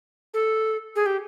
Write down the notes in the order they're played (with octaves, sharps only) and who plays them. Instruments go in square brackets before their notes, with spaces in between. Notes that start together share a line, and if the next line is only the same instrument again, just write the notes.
[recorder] A4
G#4
G4